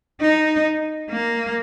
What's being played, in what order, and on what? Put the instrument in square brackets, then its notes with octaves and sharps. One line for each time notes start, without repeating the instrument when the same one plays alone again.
[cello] D#4
A#3